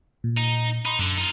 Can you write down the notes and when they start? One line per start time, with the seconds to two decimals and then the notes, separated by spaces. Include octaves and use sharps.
0.24 A#2
0.37 D#4
0.85 D#4 B5 C6
0.99 F#2 D3
1.17 D#4 F4